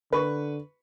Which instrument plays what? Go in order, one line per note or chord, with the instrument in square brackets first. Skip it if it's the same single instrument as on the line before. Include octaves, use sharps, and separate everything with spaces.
[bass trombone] D3 [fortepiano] B4 C#6